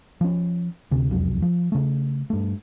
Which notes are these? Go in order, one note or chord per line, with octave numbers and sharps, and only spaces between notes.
F3 C#4
D2 C3
E1 C2 F2 F#3
F3
C#3 A3
G2 A3